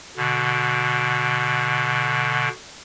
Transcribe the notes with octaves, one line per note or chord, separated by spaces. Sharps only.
B2 D3